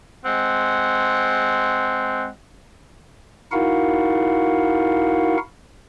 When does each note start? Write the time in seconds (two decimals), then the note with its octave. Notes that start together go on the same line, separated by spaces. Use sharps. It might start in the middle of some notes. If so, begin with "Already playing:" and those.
0.25 G#3 C4 F#5
3.52 D#4 E4 F#4 A#4 F5 F#5